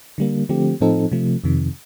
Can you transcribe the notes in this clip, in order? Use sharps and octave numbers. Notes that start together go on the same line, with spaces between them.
D3 G3 A#3
D3 F3 A3 C4 G4
A2 F3 C4 D#4 A4
C3 F3 A3
F2 C3 D#3